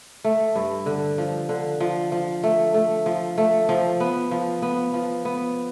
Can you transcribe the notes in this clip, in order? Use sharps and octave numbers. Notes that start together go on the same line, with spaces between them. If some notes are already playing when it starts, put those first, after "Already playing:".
A3
G2
D3
F3
D3
F3
F3
A3
A3
F3
A3
F3
B3
F3
B3
F3
B3